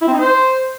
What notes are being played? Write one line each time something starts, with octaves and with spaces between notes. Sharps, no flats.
E4
C4
D#4
C5